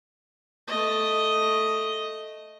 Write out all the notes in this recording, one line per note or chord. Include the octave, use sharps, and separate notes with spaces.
A3 D#5